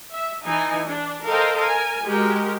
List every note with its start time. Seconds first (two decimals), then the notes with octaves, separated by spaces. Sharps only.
0.11 E5
0.45 E3 D#4 G#5
0.88 D4
1.27 A4 A#4 C5 D#5 F5 G5
1.57 A#4 G#5
2.05 G#3 F#4 G4 A#4